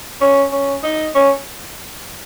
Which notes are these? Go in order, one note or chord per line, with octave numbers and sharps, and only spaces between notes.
C#4
C#4
D#4
C#4